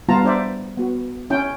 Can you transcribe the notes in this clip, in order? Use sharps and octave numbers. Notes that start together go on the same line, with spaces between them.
G3 B3 E4 F4 A5 A#5
D4 C5 D5 E5
B3 F#4
C#4 E4 G5